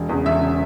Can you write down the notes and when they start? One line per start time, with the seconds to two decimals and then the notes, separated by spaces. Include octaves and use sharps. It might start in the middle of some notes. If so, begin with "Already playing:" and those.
Already playing: E1
0.09 E2 C#3
0.26 E1 E5
0.41 C#3